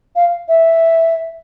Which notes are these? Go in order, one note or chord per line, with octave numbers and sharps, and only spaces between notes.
F5
E5